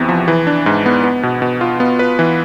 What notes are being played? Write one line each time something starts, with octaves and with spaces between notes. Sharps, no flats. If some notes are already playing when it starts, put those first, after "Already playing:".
Already playing: E2 C3 B3 E4
F3
E3
D4
G#2
B3
B3
B2
B2
F4
B3
B4
E3